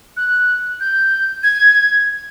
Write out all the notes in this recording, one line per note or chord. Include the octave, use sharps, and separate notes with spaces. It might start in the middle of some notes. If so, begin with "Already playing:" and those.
F#6
G6
G#6